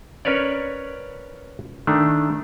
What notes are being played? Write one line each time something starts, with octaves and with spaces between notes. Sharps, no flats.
C#4 A#4 B4 C#5 D5
D#3 A3 D4